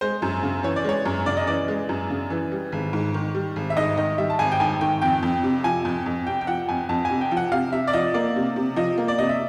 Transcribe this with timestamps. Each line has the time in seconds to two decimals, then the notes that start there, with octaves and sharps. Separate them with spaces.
0.01 G#3 C5
0.22 F#2
0.43 C#3
0.63 E3 C#5
0.76 D5
0.84 G#3 C#5
1.06 F#2
1.26 C#3 D5
1.37 D#5
1.47 E3 D5
1.68 G#3
1.89 F#2
2.10 C#3
2.30 E3
2.52 G3
2.72 G#1
2.93 G#2
3.14 D#3
3.35 G3
3.56 G#1
3.70 E5
3.77 G#2 D#5
3.97 D#3 D#5
4.18 G3 E5
4.30 A5
4.39 G#1 G#5
4.52 G5
4.60 G#2 G#5
4.81 D#3 G5
5.02 F2 G5
5.23 F2
5.43 C3
5.64 F3 G#5
5.85 F2
6.06 F2
6.27 C3 G5
6.41 G5
6.47 F3 F#5
6.69 F2 G#5
6.89 F2 A5
7.05 G#5
7.10 C3
7.21 G5
7.31 F3
7.37 F#5
7.52 C3 F5
7.73 C3 E5
7.87 D5
7.93 F3 D#5
8.14 A#3 D5
8.36 C3
8.56 C3
8.76 F3 D#5
8.98 A#3
9.08 D5
9.18 C3 D#5
9.29 E5